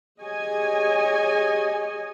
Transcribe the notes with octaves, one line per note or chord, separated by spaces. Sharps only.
G4 G#4 C#5 D#5 G#5